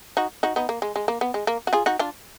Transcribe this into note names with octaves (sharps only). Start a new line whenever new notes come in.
D#4 F#4
D#4 F#4
B3 D#4
A#3
G#3
G#3
A#3
B3
G#3
A#3
F#4
F4 G#4
D#4 F#4
D4 F4